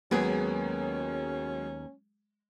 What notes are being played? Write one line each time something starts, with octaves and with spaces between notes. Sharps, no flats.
D#2 F#3 G#3 B3 C#4 G#4